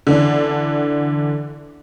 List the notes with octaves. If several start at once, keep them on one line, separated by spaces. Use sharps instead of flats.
D3 E3 D4